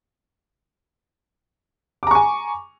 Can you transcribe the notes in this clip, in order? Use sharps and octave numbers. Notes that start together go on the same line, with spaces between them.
G#5 A#5 C#6 D6